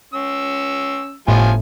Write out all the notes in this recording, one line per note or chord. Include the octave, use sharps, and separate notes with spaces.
C#4 E6
G1 A2 F3 F4 G#5